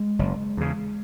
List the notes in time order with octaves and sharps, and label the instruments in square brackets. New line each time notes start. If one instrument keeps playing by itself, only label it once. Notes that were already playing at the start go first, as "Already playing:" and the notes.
Already playing: [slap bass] G#3
F#1
E2 C#3